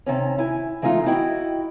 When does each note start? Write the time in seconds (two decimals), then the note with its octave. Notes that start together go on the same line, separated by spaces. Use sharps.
0.06 C3 D#3 C#4
0.38 E4 G#5
0.82 E3 G#3 A3 D#4 F4
1.06 E4 F#4 D#5 G5